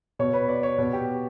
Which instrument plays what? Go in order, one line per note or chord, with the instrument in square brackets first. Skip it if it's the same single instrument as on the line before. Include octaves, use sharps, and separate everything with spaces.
[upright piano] B2 C#5
B4
D5
C#5
B2
G4